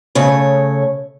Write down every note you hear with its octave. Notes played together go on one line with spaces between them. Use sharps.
C#3 A3 C#5